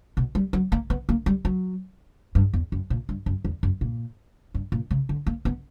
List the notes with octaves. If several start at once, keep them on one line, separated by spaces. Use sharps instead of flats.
B2
G3
F#3
A#3
B3
A#3
G3
F#3
G2
E2
F#2
A#2
G2
F#2
E2
F#2
A#2
G2
A#2
C#3
D3
A#3
B3